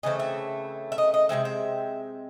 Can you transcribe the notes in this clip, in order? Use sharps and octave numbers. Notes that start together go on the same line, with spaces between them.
C#3 E3 A3 C4 D#5
E5
E5
D#5
D#5
C3 E3 G#3 C4 E5
E5